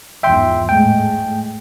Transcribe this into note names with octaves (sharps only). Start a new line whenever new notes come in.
E2 G#2 F3 E5 G5 C6
A2 G#3 A3 G5